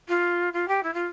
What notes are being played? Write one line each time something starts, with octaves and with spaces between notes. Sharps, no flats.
F4
F4
G4
E4
F4